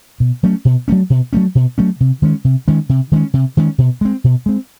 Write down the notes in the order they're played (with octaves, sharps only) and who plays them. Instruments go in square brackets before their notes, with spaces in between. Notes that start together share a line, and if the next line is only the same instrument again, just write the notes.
[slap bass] B2
F#3 A3 C#4
B2
F#3 A3 C#4
B2
F#3 A3 C#4
B2
F#3 A3 C#4
C3
D#3 G#3 C#4
C3
D#3 G#3 C#4
C3
D#3 G#3 C#4
C3
D#3 G#3 C#4
B2
G#3 C4
B2
G#3 C4